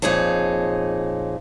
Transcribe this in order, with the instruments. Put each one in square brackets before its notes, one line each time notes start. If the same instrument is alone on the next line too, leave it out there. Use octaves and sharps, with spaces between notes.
[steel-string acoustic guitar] F2 A#2 D#4 G#4 C#5 A5